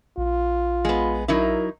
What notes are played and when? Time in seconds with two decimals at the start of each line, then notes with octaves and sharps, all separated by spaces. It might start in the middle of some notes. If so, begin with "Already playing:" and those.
0.18 A#1 F4
0.85 G#3 B3
1.28 F#3 D#4 E4 A#4